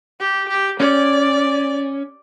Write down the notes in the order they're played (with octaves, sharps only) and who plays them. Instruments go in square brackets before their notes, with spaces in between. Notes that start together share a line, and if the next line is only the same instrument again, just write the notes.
[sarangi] G4
G4
[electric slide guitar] C#4 [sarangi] D5